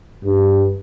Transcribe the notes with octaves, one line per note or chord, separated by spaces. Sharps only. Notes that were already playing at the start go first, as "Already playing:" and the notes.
G2